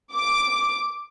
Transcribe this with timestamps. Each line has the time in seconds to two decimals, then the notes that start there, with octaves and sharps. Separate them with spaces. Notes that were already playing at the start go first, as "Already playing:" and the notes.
0.12 D6